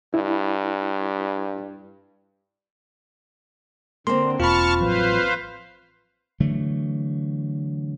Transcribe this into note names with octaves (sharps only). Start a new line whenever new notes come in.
G2 E4
D3 A#3 C4 C6
E1 F4 A5 B5 C#6 F6
A1 F3 F#3 B4 C5 F5
D3 E3 F#3 A3